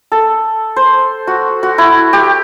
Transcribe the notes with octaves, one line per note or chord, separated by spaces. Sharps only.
A4
C5
F#4
F#4
E4
G4